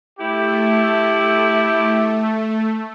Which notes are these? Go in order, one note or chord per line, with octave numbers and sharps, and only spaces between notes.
A3 E4 G4